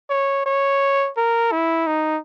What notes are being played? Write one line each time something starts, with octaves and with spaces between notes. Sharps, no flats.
C#5
C#5
A#4
E4
D#4